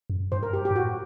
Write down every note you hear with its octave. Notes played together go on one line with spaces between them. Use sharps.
F#2
G2 C5
A#4
G4
G4
G2
A2 F#4